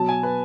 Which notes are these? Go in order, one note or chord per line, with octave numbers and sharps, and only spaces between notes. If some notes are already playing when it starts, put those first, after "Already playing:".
Already playing: B2 F#3 A5
G#5
B4